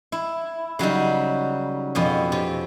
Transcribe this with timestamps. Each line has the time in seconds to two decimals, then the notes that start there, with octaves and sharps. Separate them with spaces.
0.12 E4
0.79 C#3 F#3 G3 D#4
1.95 F2 B2 C#4
2.32 C3